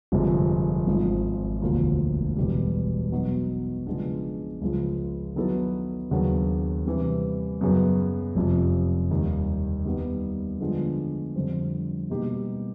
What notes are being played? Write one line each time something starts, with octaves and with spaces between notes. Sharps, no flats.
G1 F2 C3 F3 G#3
G#1 G#2 F3
E1 D2 D3 F3 A#3
E1 E2 B2 G3
B2 F#3 B3 D#4 F#4
C#3 F3 G#3 B3 D4
C#2 C#3 F3
D#3 F#3 B3 E4 A4
D#2 C#3 F#3 B3 D4
C3 E3 G3
F#2 C#3 F#3 B3
F1 F2 C3 F3
D#2 D#3 G3
D#3 G3 B3 D#4
D3 F3 G#3 B3 D4
F2 D3 G3 C4
B2 G3 A#3 D#4 G4